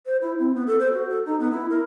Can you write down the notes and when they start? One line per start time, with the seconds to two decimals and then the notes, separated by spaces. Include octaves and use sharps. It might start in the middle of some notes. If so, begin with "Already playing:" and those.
0.06 C5
0.21 E4
0.39 C4
0.55 B3
0.67 A4
0.80 C5
0.93 F#4
1.09 A4
1.26 D#4
1.40 B3
1.51 E4
1.70 A#4